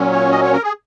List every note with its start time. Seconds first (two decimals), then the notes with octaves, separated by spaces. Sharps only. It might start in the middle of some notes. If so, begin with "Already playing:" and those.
Already playing: A#2 F#3 C#4
0.12 C#5
0.31 D#5
0.43 C#5
0.53 A#4
0.63 G#4